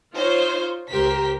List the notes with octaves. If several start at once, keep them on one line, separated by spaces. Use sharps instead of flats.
D#4 F4 C5 C#5
C#2 G4 A#4 C5 B6